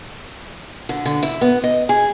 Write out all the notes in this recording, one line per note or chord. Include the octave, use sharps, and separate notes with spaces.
D3
D3
E4
B3
D#5
G#4